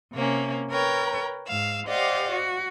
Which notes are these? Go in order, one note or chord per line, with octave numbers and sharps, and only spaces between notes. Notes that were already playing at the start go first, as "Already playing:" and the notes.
C3 A#3 C#4
A#4 B4 C#5 G5 A#5
G#2 F5 E6
G4 C5 D5 D#5 F5 F#5
F#4